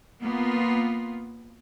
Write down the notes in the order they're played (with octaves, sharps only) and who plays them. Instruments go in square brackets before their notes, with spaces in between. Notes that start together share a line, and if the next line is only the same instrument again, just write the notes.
[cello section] A#3 B3 F4